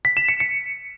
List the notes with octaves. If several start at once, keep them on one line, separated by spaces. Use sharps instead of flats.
B6
E7
C#7
C#7